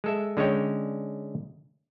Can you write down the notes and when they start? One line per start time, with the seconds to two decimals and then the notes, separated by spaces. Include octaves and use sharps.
0.04 G#3 A4 E5
0.37 D3 G#3 C#4 C#5 G5